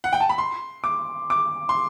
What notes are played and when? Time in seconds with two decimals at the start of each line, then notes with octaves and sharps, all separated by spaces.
0.04 F#5
0.13 G5
0.20 A5
0.29 B5
0.38 C6
0.84 D6
1.30 D6
1.69 C6